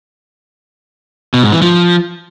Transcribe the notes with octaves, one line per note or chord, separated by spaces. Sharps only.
B2
G#2
E3
F3